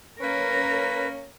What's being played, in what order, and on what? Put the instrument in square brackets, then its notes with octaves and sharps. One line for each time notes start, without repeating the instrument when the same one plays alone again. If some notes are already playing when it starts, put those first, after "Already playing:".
[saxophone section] A#3 C#4 [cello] A#4 [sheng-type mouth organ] B4